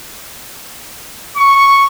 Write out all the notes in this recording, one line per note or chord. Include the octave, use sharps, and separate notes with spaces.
C#6